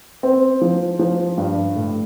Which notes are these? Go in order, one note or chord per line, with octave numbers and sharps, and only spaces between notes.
C4
F3
F3
G2
A2